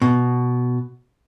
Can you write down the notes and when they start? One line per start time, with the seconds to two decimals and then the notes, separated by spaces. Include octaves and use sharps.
0.02 B2